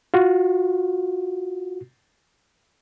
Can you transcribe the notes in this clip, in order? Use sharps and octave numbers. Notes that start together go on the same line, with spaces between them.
F4 F#4